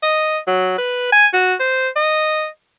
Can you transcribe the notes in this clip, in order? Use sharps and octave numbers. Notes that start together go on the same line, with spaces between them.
D#5
F#3
B4
G#5
F#4
C5
D#5